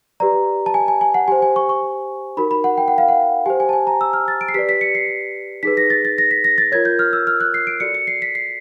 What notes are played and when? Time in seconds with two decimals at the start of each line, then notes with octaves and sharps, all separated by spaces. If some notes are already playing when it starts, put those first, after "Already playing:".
0.20 G4 B4 D5 A#5
0.66 A5
0.74 G#5
0.88 G#5
1.01 G#5
1.14 F#5
1.28 G4 C5 G#5
1.42 G#5
1.56 C#6
1.69 C#6
2.37 D#4 F#4 A#4 B5
2.51 B5
2.64 F#5
2.78 G5
2.88 F#5
2.98 F5
3.09 F#5
3.46 G4 C5 G#5
3.60 G#5
3.69 A5
3.73 G#5
3.87 A#5
4.01 E6
4.13 F6
4.28 A6
4.41 D7
4.48 C7
4.54 G4 B4 D5 B6
4.69 B6
4.81 C#7
4.95 C7
5.63 D#4 G#4 B4 B6
5.77 A#6
5.90 A6
6.05 A6
6.18 A#6
6.31 B6
6.44 A#6
6.58 A6
6.72 F4 A#4 C#5 G#6
6.85 G6
6.99 F6
7.13 E6
7.27 F6
7.41 F#6
7.54 C7
7.67 D7
7.80 F#4 A4 D5 C#7
7.95 C#7
8.07 C7
8.22 B6
8.35 C7